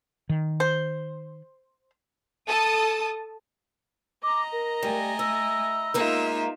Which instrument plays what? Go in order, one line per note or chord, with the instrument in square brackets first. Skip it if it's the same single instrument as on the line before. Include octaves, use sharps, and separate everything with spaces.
[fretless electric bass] D#3
[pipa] C5
[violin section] A4 A5 D#6
[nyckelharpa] D#5 A#5 [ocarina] D6
[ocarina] A#4
[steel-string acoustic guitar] G3 [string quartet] A3 G#5
[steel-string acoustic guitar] E4 [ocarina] E6
[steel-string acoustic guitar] G#3 A#3 A#4 [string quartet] D#4 F4 E5